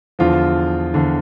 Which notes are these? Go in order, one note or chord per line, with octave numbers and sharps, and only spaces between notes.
E2 D3 F3 F4
E2 D3 F3